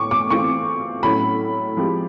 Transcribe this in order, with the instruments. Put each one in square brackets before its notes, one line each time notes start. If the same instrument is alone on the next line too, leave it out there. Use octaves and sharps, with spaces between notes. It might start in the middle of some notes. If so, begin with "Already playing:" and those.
Already playing: [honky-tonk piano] A2 A3 C#4 [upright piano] C#6 D6
[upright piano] D6
[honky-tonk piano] E3 A3 C4 F4 [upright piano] C#6
[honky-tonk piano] A2 F#3 A3 C#4 E4 [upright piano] B5
[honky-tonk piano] F3 G#3 C4 E4 G4